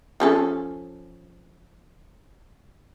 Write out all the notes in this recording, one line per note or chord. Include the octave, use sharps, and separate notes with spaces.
F3 C#4 A4